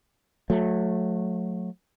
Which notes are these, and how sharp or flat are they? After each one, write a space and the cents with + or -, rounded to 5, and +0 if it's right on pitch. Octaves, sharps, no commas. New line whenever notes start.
F#3 -30 A3 -10